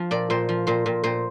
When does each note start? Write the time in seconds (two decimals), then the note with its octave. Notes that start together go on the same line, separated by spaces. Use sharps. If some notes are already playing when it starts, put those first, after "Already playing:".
Already playing: F3
0.11 A#2 D5
0.30 A#2 C5
0.49 F3
0.67 A#2 C5
0.86 A#2
1.04 A#2 C5